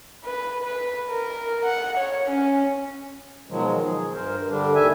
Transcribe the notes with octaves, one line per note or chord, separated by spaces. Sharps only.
B4
B4
A#4
F#5
C#5
C#4
B2 D#3 F3 F#3 G#3
G#4
G2 A#4 C5
D3 G3 D4
D#2 D#3 E5 G#5